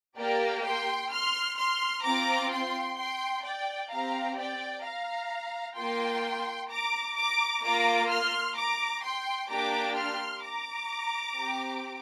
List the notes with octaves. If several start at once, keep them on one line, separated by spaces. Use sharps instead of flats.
A#3 G4 A#4 D5
G5 C6
C6 F6
C6 F6
C4 F4 A#5 D6
G5 C6
G5 C6
D5 G5
C4 G4 F5 A#5
D5 G5
F5 A#5
A#3 F4 G5 C6
A#5 D6
A#5 D6
A#3 F4 A#5 D6
C6 F6
A#5 D6
G5 C6
A#3 D4 G4 A#5 D6
C6 F6
A#5 D6
C4 G4